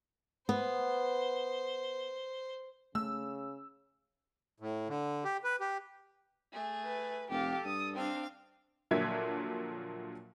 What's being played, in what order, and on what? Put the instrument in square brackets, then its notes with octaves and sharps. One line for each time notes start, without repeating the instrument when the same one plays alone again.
[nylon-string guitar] B3 [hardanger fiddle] C5
[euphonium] C#3 [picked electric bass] A3 [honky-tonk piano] E6
[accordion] A2
D3
G4
B4
G4
[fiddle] A3 G#4
[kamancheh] B4
[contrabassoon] F1 [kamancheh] G4 F5 [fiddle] A4
[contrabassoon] G2 [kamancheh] D#6
[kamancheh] C4 D4 [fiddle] F5
[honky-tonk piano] A#2 D3 F3 F#3 E5 G#6